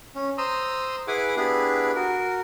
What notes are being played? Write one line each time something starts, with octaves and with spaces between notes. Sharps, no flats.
C#4
C5 A#5 C6 D#6 E6
E4 G#4 B4 F#5 G#5 D6
B3 D4 E4 G4 G#4 B4
F#4 A#4